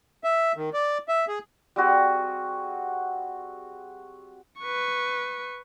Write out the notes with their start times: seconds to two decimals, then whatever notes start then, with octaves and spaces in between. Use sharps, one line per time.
0.24 E5
0.56 D#3
0.74 D5
1.08 E5
1.28 G#4
1.76 G3 C4 F#4 G#4
4.60 B4 C#6